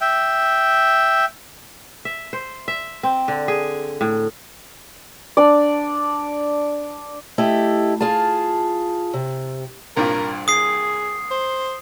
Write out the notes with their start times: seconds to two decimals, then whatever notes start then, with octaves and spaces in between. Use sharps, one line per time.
0.01 E5 G5
2.05 E5
2.33 C5
2.68 E5
3.03 C4
3.28 D3
3.48 G#4
4.01 A2
5.37 D4 D5
7.38 A3 E4 G4 D#5
8.01 F4 G#4 F5 A5
9.14 C3
9.97 C2 G2 A#2 A#4
10.48 G#4 D#6 C7
11.31 C5